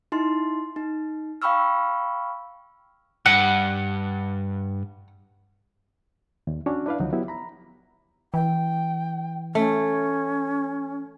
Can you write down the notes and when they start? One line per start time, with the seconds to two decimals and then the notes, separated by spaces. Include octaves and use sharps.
0.12 D#4 E4 C6
0.76 D#4
1.42 F5 G5 B5 C#6 E6 F6
3.26 G2 F#5
6.47 D#2
6.66 C#4 D4 F#4 C#5
6.86 D4 E4 B4 D5 F5
7.00 C#2 D3 F3 F#3 D#4 F#4
7.12 F#3 B3 E4 G4
7.28 A#5 B5
8.34 E3 G5
9.55 A3 C#4